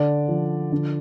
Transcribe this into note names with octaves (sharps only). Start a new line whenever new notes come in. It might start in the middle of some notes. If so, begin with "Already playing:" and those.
Already playing: D3 D5
F3
D3